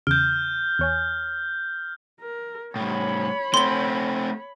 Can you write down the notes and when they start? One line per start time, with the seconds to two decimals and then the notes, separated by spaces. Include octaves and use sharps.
0.07 E2 C#3 F6 G6 D7
0.79 E2 C#5 G#5
2.20 A#4
2.76 A2 G3 C#5 B5
3.54 A3 C4 C6 G7